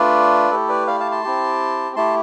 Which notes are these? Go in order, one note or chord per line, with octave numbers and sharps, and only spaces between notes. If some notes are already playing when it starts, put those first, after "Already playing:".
Already playing: A3 D4 F4 B4 D5
A3 E4 G4 A4
B4 D5
D5 F5
F5 A5
A5 C6
C4 E4 G4
A3 E4 G4 A5 C6